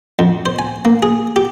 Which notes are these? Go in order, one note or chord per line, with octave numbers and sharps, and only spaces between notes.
F2
C5
G#5
A#3
G#4
G4